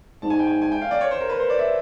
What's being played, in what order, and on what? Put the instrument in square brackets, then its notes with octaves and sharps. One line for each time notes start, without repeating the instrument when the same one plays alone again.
[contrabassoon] G#2 [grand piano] A5
[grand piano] G#5
G5
G#5
G#5
G5
F5
D5
C#5
C5
A#4
B4
C5
D5
E5